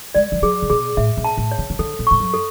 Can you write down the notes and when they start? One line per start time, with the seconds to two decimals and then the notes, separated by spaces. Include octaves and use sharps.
0.15 G#3 D5
0.32 E3
0.42 F#3 G#4
0.62 C#3
0.70 B2 G#4
0.97 A2 E5
1.17 B2
1.24 A5
1.37 A2
1.51 C#5
1.58 C#3
1.70 C#3
1.79 D3 A4
1.99 B2
2.07 G#2 C#6
2.20 F#2
2.34 A4